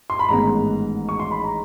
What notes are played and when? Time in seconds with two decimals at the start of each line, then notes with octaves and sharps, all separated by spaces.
0.10 C6
0.19 B5
0.29 A1 G#2 D#3 G#3 B3 A#5
1.09 C#6
1.20 C6
1.31 B5
1.44 A#5